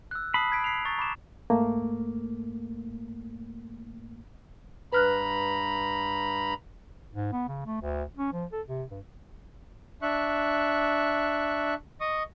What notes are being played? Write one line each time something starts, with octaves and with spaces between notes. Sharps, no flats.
E6 F#6
A5 B5 D#6 C7
G#6 B6 D7
C7 F7
A#5 C#6 A6
B5 D6 E7
G#2 A3 A#3
G2 B4 A#5 B5 F6 F#6
G#2
B3
C#3
A3
D2
C#4
F3
A4
C3
G2
D4 E5 C#6 F#6
D#5 C#6 D#6